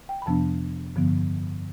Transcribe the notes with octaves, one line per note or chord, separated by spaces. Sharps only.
G5
B5
F2 C3 F3 B3 D4 A5
G2 D3 F3 B3